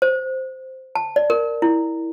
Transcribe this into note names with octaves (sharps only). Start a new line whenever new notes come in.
C5
A5
D5
A#4
E4